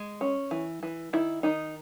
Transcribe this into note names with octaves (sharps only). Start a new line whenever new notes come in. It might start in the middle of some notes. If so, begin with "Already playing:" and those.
Already playing: G#3
C#4
E3
E3
D#3 E4
D#3 D#4